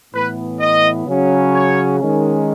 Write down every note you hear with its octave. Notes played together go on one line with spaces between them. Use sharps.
A2 E3 B3 B4
D#5
C#3 F#3 C#4
C#5
D#3 G#3 C#4